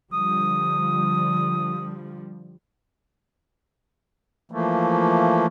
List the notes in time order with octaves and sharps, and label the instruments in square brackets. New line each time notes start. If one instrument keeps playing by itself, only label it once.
[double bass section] D3 F3 G3 [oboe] D#6
[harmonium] E3 F3 A3 A#3